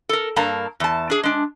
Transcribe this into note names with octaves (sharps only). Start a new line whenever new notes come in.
A4 A#4
G2 A#3 A5 A#5
E2 A5
D4 G#4
G#3 D4